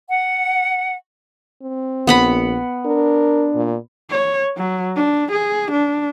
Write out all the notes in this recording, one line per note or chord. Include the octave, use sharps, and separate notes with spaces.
F#5
C4
A#1 B3 F#5 B5
D4 A#4
A#2
C#5
F#3
D4
G#4
D4